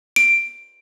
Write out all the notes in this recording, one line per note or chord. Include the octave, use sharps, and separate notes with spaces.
D7